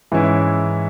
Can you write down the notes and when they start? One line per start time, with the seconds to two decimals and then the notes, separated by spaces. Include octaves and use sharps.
0.12 G#2 E3 C#4 E4